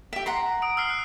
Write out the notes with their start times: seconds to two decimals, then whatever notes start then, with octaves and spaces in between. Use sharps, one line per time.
0.13 G4 E5
0.26 F#5 A#5 C6
0.62 D#6 D7
0.77 E6 F6 C7
0.90 F#6